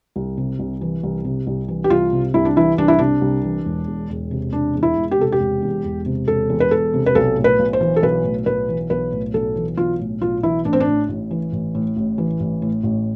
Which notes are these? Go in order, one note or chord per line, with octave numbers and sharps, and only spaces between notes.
C2
C3
C2
E3
C2
C3
C2
E3
G4
C2 F4
C3
C2 E4
D4
E3 E4
C2 D4
E4
C3 D4
C2
E3
E1
E2
E1
C3
E1 D4
E2
E4
E1
G4
C3 A4
G4
E1
E2
E1
C3
E1 A4
E2
B4
E1 A4
C3
B4
B1 A4
A2
B4
B1
C5
E3
A4
B1 B4
A2
B1 B4
E3
B1 B4
A2
B1 A4
E3
B1 F4
A2
B1 F4
E3 E4
A1 D4
C4
D4
A2
A1
E3
A1
A2
A1
E3
A1
A2
A1